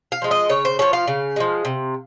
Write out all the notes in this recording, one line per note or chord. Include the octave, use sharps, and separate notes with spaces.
F5
F3 G#3
D#5
C#3 C#5
C5
F3 G#3 C#5
F5
C#3
F3 G#3
C3